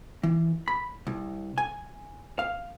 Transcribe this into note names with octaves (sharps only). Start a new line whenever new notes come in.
E3
B5
C2
G#5
F5